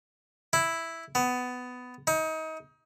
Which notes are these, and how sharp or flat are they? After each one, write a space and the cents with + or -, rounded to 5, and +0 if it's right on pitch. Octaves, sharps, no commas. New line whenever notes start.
E4 +0
B3 +15
D#4 +30